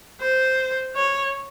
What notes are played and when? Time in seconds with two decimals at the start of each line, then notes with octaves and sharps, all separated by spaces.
0.21 C5
0.96 C#5